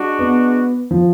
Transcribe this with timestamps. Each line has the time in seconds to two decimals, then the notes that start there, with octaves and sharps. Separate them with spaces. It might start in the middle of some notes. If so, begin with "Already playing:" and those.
Already playing: G#3 D4 F#4
0.19 B3
0.91 F3